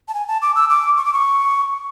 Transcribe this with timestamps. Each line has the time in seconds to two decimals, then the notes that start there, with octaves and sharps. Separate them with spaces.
0.08 A5
0.14 G#5
0.28 A5
0.42 D6
0.56 E6
0.70 D6
0.97 C#6
1.05 D6
1.13 C#6